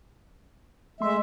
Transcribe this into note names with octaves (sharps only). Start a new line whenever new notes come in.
G#3 A3 E5 C6